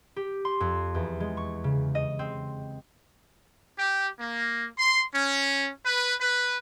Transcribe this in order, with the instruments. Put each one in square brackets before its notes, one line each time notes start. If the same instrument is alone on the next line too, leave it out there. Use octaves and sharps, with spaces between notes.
[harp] G4
C6
F2
E2
G#3
C#6
C#3
D#5
C4
[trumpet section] G4
A#3
C6
C#4
B4
B4